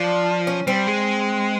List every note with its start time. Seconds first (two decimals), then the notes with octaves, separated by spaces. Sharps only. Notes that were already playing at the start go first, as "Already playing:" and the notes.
Already playing: F3 D4
0.47 C#4
0.67 G3 C4
0.87 G#3